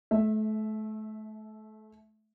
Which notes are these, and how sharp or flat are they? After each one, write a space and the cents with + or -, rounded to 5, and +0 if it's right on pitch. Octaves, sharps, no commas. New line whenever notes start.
A3 -30 E5 +0